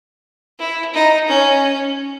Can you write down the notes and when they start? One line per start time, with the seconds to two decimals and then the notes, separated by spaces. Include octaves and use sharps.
0.59 E4
0.94 D#4
1.28 C#4